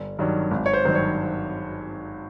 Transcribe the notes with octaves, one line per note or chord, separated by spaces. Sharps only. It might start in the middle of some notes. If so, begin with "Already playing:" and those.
Already playing: G1
G2 D#3 F#3
G#1
C#5
C5
G2 D#3 F#3 C5
C#5